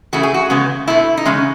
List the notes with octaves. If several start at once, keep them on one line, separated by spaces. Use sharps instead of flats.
C#3 E3 A3 F#4
G#4
F#4
E2 C#3 G#3 B3
B2 A3 E4
D#4
E2 C#3 G#3 C#4